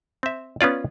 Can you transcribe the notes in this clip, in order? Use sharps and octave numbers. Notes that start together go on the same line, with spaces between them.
C4 E5
B3 C#4 F4 D5